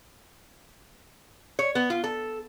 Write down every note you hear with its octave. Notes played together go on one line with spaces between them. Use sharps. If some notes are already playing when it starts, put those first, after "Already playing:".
C#5
B3
F4
A4